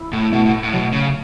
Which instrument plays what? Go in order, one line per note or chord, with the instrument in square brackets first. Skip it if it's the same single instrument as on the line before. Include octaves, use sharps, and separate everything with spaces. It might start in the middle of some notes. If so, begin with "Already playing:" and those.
Already playing: [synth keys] E4
[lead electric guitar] A2
[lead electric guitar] B2 [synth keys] A3
[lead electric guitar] B2
A2
A2
[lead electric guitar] B2 [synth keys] F#3
[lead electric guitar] C#3